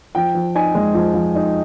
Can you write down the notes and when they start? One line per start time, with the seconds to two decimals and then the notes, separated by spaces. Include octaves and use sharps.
0.15 F3 G5
0.35 F3
0.55 D#4 G#5
0.75 G#3
0.94 F3
1.14 F3
1.35 D#4